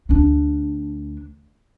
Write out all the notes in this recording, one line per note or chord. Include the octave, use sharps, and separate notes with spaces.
D2 D4